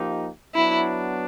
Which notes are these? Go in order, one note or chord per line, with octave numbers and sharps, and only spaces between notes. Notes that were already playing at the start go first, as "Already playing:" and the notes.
Already playing: F3 A#3 D#4 G4
F#3 B3 D4 E4